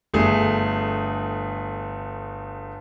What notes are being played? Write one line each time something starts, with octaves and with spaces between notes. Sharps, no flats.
G1 A3 G#4